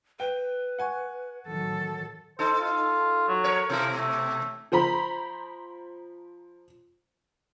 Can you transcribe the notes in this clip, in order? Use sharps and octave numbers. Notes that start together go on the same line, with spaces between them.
B4 G5
F#5 G#5 C#6
A1 D#3 F#3 A4
D#4 A4 C5
F4
F#3
A#4 C#5
B2 F3 E4
A3
F3 C5 A#5 B5